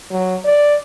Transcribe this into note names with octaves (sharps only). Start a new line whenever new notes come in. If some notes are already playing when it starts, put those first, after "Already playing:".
F#3
D5